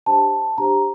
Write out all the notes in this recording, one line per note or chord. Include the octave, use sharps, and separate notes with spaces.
D4 G4 C5 A5
D4 G4 C5 A#5